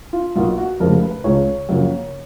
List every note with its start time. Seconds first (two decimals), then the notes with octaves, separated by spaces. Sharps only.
0.13 F4
0.35 B1 B2 A#3 F4
0.58 F#4
0.80 F1 F2 C#3 G#3 A#4
1.03 B4
1.24 C#2 C#3 G#3 C#5
1.69 F#2 C#3 F3 A#3